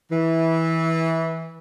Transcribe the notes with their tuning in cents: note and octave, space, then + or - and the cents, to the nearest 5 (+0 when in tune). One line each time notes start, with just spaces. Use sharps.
E3 -15